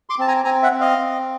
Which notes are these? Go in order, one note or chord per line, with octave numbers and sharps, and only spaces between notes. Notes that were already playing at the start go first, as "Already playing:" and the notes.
C6 D6
C4 A5
G#5 A#5
C4 G#5 A#5
E5 F#5
C4
D#5 F5
C4